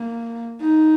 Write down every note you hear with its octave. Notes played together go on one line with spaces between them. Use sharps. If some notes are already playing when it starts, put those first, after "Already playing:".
Already playing: A#3
D#4